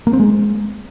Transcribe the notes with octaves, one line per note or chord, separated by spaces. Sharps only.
A#3
C4
G#3